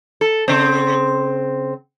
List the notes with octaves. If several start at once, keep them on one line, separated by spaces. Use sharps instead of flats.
A4
C#3 C4